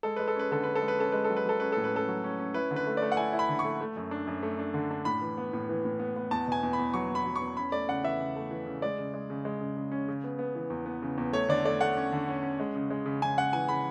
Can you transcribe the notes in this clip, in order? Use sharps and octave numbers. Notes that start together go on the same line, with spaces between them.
G#3 A4
G#3 B4
A4
C#4 B4
D3 A4
C#4 B4
A4
G#3
B4
C#4 A4
G#3 B4
A4
F#3
B4
F#3 A4
C#4 B4
A2 A4
B4
C#4 A4
F#3
C#4
C#4
E4 B4
D3
B4
A3
A3 D5
F#5
E4 G#5
E4
B5
D3
C#6
A3
A3
F#2
D4
F#2
A3
D4
D3
D4
A2 B5
E3
B3
A2
E3
A2
B3
B3
E2 A5
B2 G#5
E2
B5
E2
F#3 C#6
E2 B5
F#3
C#6
E2
C#4 B5
A3 D5
C#3 F#5
E3 E5
C#3
A3
E3
C#3
G#3 D5
C#3
G#3
C#3
G#3
C#3
C#3
C#4
C#3
B3
B3
E3
E2
B3
C#3
E2
A3 C#5
D3 D5
A3 D5
A3 F#5
C#4
D3
C#4
C#4
G#3
C#3
G#3
C#3
C#3 G#5
C#3 F#5
E3 G#5
C#3 B5